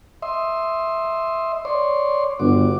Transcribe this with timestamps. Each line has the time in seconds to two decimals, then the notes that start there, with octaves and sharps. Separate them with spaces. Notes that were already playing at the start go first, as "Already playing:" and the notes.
0.22 D#5 E5 C6
1.65 C#5 D5 C6
2.40 G1 F#4 D6